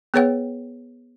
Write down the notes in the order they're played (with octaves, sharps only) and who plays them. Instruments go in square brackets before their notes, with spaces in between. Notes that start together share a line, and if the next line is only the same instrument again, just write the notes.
[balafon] B3 G#4 B4 C#5 F#5 G5